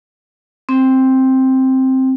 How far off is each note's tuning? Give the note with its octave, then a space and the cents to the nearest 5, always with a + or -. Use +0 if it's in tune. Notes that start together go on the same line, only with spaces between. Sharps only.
C4 +5